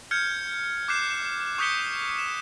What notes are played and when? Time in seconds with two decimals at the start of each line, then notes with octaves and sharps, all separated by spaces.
0.11 F6 G6 G#6 C#7
0.88 D6 F#6 G6 C7 E7
1.58 C#6 D#6 G6 B6 C#7 G7
2.18 E7